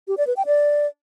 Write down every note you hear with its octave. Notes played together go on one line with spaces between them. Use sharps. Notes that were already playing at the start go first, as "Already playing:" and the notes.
G4
D5
B4
G5
D5